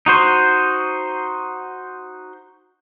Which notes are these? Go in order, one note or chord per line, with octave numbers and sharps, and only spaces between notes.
D#4 F#4 C5